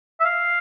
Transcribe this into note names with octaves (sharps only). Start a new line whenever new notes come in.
E5
F5